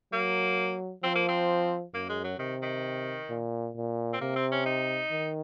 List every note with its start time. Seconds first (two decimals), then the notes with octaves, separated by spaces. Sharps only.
0.13 F#3 A#3
1.03 F3 C4
1.15 A#3
1.29 C4
1.93 F#2 A#3
2.09 G#3
2.24 F#3
2.39 C3 D#3
2.62 D#3
3.30 A#2
3.76 A#2
4.13 C4
4.21 C3 A#3
4.36 C4
4.52 C#4
4.66 D#4
5.12 D#3